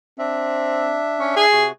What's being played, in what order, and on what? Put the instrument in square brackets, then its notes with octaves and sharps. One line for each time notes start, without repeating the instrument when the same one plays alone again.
[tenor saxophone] C4 [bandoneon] D4 E5
[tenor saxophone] C#4
G#4
[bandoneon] C3 F#4